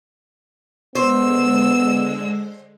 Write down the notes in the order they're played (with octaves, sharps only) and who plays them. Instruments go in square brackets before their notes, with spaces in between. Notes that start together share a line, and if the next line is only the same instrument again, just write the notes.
[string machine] D3 G#3 [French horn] B3 [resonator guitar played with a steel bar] C5 [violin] E6